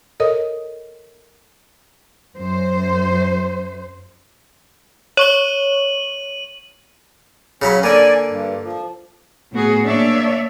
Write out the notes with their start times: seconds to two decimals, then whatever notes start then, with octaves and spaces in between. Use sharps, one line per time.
0.20 A4 A#4 C#5 D#5 D#6
2.37 F#2 C5
5.17 C#5 C#6 D#7 F#7 G7
7.62 C#3 F#3 C#4 B5
7.83 D3 A#3 D5 G#5
8.30 G2
8.63 F3
9.52 A2 B3 F#4 G#4
9.85 A#3 D4 C#5 D5 E5